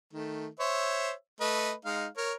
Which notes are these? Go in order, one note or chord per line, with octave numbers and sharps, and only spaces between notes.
D#3 A3
C5 C#5 E5
A3 B4 D#5
G#3 D#4 F5
A#4 C#5